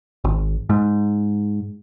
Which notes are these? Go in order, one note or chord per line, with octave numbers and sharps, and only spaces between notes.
G#1
G#2